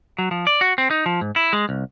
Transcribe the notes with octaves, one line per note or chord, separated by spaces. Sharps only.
F#3
F3
D5
F#4
C4
D#4
F3
G#2
E4
G#3
C2